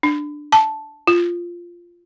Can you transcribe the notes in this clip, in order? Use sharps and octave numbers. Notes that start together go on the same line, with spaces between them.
D4
A5
F4